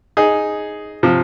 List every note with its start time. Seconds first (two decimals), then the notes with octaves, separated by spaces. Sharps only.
0.17 D#4 G#4
1.03 C3 F3